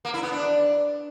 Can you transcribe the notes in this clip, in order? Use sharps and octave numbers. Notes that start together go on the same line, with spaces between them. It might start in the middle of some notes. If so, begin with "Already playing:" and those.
A#3
E4
B3
D4